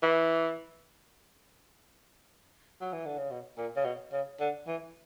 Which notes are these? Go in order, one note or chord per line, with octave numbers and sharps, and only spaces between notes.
E3
F#3
E3
D3
C#3
B2
A#2
C#3
B2
C#3
D3
E3